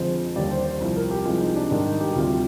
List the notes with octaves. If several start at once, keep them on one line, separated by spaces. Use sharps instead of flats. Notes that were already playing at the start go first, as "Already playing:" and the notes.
Already playing: F2 D3 F3 G#3 C5
D#2 D3 G3 D5
C5
C5
C2 C3 F3
A#4
G4
C2 C3 F3 G#3 F4
D#4
D4
G#2 D#3 G3 D4
D#4
G4
G4
D2 C3 G3 F4